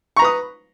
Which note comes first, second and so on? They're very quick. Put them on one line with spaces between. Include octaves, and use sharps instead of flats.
C#6 A#5 B4 D#6